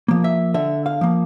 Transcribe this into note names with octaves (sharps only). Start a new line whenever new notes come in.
F3 A#3
E5
D3 E5
F5
F3 A#3